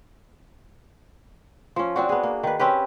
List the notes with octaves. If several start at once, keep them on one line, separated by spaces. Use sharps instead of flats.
F3 C#4
C4 D4 F#4
B3 G#4
A#3
D#3 B4
C4 C#4 G4 B4